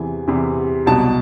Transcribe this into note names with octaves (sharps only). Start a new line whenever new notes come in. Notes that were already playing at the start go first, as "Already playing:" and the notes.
Already playing: E2 C3 E3 G#5
E2 C3 E3
C2 B2 F#3 A5